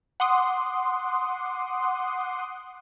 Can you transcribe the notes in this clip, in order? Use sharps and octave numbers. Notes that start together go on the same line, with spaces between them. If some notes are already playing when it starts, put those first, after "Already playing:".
F#5 C6 D6 D#6